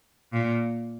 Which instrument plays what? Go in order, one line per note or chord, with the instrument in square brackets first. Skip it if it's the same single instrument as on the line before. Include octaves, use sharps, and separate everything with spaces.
[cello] A#2